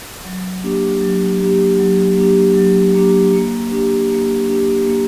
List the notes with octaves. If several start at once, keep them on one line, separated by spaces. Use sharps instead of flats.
F#3
A#3 D4 G4
F#3
A#3 D4 G4
F#3
A#3 D4 G4
F#3
A#3 D4 G4
A#3
D4 G4
A#3
D4 G4
A#3